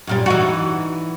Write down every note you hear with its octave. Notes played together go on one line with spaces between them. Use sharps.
F#2 A#2 G3
E3 D#4 F#4